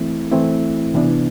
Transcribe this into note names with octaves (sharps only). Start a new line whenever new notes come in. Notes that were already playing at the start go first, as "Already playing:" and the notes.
Already playing: E3 A3 C4 E4
E3 A3 C4 E4
C3 E3 B3 D4